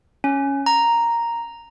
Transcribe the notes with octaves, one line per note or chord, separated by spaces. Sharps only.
C#4
A#5